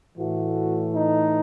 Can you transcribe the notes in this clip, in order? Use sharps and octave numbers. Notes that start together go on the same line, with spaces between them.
A2 E3 A3 F#4
D#4